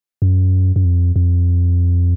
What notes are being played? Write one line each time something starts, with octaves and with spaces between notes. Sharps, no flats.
F#2
F#2
F2
F2